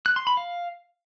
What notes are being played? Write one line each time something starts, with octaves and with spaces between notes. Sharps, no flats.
F#6
C6
B5
F5